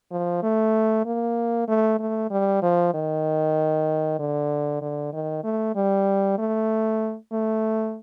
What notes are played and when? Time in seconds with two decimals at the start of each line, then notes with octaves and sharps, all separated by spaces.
0.12 F3
0.43 A3
1.06 A#3
1.68 A3
1.99 A3
2.31 G3
2.62 F3
2.94 D#3
4.19 D3
4.82 D3
5.13 D#3
5.44 A3
5.76 G3
6.38 A3
7.32 A3